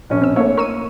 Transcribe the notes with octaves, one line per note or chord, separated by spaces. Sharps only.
A#1 C#4
C4 E6
A3 A#3 E4 C#5
A#4 C#6 E6 D#7